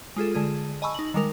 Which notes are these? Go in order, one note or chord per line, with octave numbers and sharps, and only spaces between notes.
G#3 F4 G#4 A4
D3 G#3 G#4
D#5 G#5 A5 B5 C#6 E6
D#4 F#7
D#3 G3 G#3 A#4